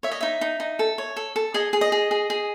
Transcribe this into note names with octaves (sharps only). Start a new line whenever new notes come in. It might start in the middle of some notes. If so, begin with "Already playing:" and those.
C#5 E5
D#5
D#4 E5
D#4
D#4
A4
C#5
A4
A4
G#4 D#5
G#4
D#5
G#4
G#4
G#4